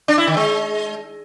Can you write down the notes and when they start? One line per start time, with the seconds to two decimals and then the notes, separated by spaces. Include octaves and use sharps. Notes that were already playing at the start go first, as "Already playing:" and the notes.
0.08 D4
0.18 E4
0.27 D#3
0.37 G#3